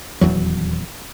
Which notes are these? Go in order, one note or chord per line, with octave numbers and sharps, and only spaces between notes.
D#1 B1 E2 F#3